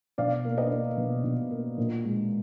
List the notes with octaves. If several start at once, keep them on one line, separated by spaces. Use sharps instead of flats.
B2 D5 F5
A#3
B4 D#5
A#3
B2
B2
A#3
A#2
G#3